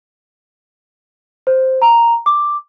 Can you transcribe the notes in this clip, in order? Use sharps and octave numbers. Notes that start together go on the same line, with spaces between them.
C5
A#5
D6